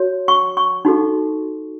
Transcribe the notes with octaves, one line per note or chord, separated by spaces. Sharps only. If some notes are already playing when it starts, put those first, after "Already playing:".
Already playing: F#4 C#5
C#6
C#6
D#4 F#4 A4